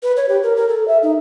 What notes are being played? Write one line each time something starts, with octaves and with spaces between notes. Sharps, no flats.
B4
C#5
G4
A#4
A#4
A4
E5
D#4